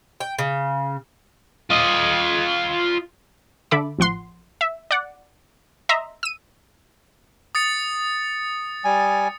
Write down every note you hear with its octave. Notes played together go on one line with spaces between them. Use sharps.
G5
C#3
F4 D#5
D3 A4 E5 B5 D6
A1 F3 F#5 C6
E5
D5 F#5
D#5 E5 A#5 C6
E6 D#7
D#6 A6 C#7
G3 G#5